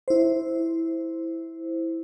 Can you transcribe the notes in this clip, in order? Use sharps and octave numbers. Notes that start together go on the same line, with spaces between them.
E4 C5